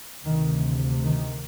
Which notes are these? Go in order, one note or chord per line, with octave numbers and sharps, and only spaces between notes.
D2 C3 D#3
D#3